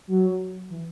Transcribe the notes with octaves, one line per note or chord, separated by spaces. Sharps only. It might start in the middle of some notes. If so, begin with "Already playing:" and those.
F#3
E3